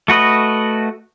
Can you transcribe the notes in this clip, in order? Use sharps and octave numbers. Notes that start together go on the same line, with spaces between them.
A3 F#4 B4 D#5